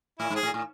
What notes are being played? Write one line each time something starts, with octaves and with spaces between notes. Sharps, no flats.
A2 E4
G#2
G#4
A2
A2